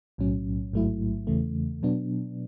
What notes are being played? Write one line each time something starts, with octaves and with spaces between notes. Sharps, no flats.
B1 A2 F#3 C#4
A1 G#2 F#3 A3 E4
E2 C#3 E3 A3
B2 F#3 B3 D4